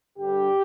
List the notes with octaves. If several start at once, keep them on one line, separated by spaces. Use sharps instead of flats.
G2 D3 G3 G4